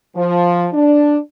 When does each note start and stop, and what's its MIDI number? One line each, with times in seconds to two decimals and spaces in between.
0.16 0.66 53
0.73 1.16 62